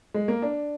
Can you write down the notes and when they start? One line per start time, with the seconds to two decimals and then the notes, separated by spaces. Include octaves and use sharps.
0.14 G#3
0.28 A#3
0.42 D4